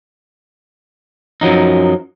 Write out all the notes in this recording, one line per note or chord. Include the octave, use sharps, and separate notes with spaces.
F#2 F3 F#3 D#4